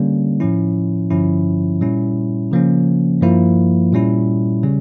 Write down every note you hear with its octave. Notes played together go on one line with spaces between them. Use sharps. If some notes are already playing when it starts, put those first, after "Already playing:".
Already playing: D3 G3 A#3 C#4
A2 F3 C#4 E4
G2 D3 F3 C#4 E4
A#2 G3 C#4 E4
C#3 F3 A#3 C#4
G2 F3 A#3 E4
A#2 G3 C#4 E4
C#3 G3 C#4